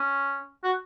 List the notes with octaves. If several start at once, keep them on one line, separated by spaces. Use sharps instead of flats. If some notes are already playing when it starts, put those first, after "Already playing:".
Already playing: C#4
F#4